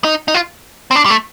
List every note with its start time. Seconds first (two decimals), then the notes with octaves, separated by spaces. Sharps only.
0.04 D#4
0.28 D#4
0.34 F4
0.91 C4
0.96 D4
1.06 G3
1.10 A3